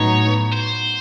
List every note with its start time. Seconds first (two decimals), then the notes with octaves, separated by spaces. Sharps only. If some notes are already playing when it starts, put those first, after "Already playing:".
Already playing: A2 F#3 B3 D#4 C#5
0.53 C5